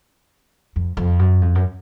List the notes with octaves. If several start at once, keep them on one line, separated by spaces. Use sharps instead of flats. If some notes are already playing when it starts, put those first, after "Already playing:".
F2
F2
F#2
F2
F#2